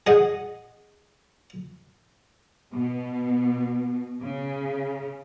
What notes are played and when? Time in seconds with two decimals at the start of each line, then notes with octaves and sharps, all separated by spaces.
0.07 G#4 D#5 F#5
2.73 B2
4.22 C#3